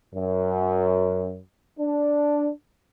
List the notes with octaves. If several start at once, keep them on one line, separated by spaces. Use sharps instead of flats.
F#2
D4